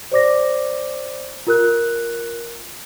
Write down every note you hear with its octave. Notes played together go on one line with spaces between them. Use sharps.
C5 D5 D6 A#6
F4 A#4 F#6